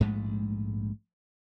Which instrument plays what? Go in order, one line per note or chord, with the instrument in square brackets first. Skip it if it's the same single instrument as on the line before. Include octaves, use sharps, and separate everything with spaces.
[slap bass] A#1 G#2 G#3 A3